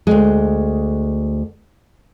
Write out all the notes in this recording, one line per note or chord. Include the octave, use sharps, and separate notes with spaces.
D2 G#3